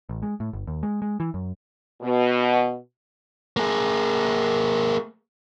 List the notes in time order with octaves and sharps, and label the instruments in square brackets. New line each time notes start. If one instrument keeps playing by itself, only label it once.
[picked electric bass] A1
G#3
A2
G1
D#2
G#3
G#3
E3
F#2
[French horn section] B2
[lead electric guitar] A#3 G#4